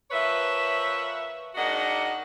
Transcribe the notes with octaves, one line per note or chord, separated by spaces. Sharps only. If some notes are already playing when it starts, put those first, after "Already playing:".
F3 A#4 B4 C#5 E5
G#2 A#3 D4 F#4 D#5 F#5